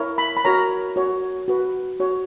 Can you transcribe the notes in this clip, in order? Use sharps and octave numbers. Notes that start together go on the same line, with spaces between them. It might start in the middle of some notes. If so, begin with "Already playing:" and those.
Already playing: E4 A#4 C#5
B5
B5
F#4 A#4 C#5 A#5
F#4 C#5
F#4 B4
F#4 C#5